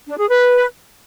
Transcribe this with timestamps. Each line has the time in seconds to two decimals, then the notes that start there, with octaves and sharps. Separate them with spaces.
0.08 D4
0.18 G#4
0.28 B4